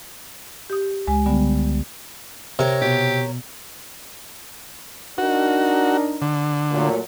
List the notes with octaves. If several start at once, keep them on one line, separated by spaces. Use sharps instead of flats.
G4 D#6
C#2 G#3 G#5
D3 G3 B3
C3 A#4 C#5
B2 G4
D4 D#4 F#4 A#4
D3
A#2 F#3 A3